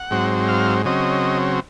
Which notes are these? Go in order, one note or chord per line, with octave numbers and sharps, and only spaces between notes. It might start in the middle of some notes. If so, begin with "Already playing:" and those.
Already playing: F#5
G#2 F#3 C4
F5
C#3 F#3 C4 D#5